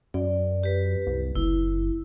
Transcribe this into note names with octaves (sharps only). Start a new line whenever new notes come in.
F#2 D5
G4 B4
C2
F#1 E4